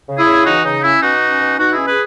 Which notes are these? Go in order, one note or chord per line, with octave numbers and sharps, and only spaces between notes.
C#3
E4 G#4
C#3
E3 D#4 F#4
C#3 D#4
C#4 E4
B2 D#4 F#4
C#4
B2
B2 D#4 F#4
C#4 E4 G#4
G#4 B4